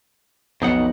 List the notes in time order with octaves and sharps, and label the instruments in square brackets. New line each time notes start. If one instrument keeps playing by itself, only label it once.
[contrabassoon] B1 [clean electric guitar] F2 D#4 F#5